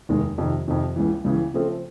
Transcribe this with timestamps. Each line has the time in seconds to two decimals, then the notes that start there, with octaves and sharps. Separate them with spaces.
0.09 F1 D#2 D#3 G#3
0.38 F2 C3 D#3
0.68 F2 C3 D#3
0.96 C#2 C#3 E3
1.24 C#2 C#3 E3
1.54 C#3 F3 A3 C4